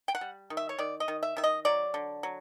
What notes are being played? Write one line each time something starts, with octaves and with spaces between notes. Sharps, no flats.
G5
F#5
G3
D#3
E5
C#5
D#3 D5
D#5
D#3
E5
D#3 E5
D#5
F#3 D5
D3
F#3